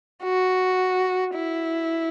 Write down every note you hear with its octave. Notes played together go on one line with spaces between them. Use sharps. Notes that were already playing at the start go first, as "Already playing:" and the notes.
F#4
E4